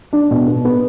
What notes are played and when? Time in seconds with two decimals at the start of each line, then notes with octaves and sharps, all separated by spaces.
0.13 D4
0.31 B2
0.47 B3
0.65 B3